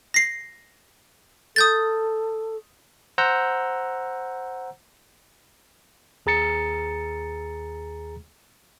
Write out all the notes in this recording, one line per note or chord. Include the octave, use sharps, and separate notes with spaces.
A#6 C7
A4 D#6 G6 A6
C5 F#5 A#5 E6 G6
D#2 G#4 A#5 A6 C#7